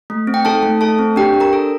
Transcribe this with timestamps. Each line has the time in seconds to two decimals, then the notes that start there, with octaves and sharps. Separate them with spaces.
0.10 A3
0.27 C4
0.34 G5
0.45 D#4 A4 A5
0.63 A3
0.80 A3 A4 A5
0.99 C4
1.16 D4 G4 G5
1.34 D4
1.40 A#4 A#5
1.53 A4